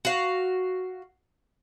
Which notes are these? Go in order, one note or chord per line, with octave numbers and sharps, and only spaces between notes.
F#4 F5